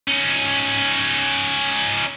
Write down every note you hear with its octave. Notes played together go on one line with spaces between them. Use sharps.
C#4 D#4